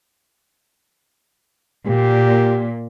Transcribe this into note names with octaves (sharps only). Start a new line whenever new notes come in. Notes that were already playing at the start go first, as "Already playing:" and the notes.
A#2 G4